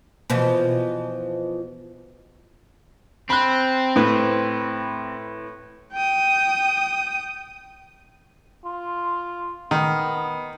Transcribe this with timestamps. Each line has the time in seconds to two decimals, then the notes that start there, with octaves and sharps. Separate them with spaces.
0.30 B2 E3 F3
3.30 C4 B5 F#6
3.96 A2 B4
5.93 G5 D#6
8.65 F4
9.71 D#3 B3